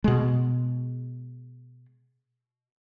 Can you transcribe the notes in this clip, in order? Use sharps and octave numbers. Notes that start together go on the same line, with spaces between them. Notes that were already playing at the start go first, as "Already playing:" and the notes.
B2 G#3